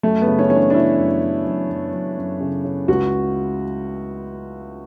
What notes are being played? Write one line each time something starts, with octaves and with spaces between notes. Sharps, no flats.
F#2 A3
B3
C#3
C#4
E3 C#4
D4
D4
C#3 E4
F#2
F#2
F#2
F#2
F#2
F#2
C#3
C#3
C#2 F#4